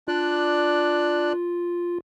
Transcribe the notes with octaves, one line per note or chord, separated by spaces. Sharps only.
D4 F4 D5 F#6